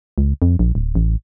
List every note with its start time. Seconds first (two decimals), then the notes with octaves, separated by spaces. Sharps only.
0.18 C#2
0.42 F2
0.59 A#1
0.75 D1
0.95 A1